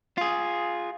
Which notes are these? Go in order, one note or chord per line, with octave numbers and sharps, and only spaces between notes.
F4 G#4